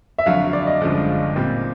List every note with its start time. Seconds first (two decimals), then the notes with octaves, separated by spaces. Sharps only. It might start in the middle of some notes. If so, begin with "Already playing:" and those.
0.18 E5
0.26 F#1 F2 D3 F#3 F5
0.53 D5
0.67 D#5
0.81 G1 F#2 D3 F3 G#3
1.36 A#2 G3 C4